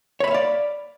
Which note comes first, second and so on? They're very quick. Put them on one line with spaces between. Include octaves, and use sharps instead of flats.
C#5 B5 E5 F5 D5